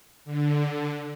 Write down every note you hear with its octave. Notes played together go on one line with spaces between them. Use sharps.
D3